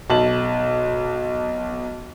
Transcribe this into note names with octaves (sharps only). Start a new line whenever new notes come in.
B1 A5 F#7